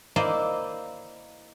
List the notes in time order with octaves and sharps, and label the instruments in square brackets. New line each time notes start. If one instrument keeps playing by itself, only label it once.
[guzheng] A#3 E4 C5 D5 D#5